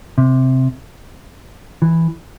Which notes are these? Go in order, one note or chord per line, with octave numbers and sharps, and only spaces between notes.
C3
E3